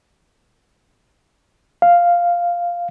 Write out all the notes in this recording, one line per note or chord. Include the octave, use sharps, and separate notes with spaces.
F5